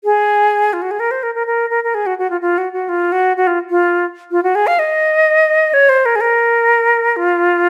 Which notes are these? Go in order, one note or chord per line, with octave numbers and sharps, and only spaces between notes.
G#4
F4
F#4
G#4
A#4
C5
A#4
A#4
A#4
A#4
A#4
G#4
F#4
F#4
F4
F4
F#4
F#4
F4
F#4
F#4
F4
F4
F4
F#4
G#4
F5
D#5
C#5
C5
A#4
G#4
A#4
F4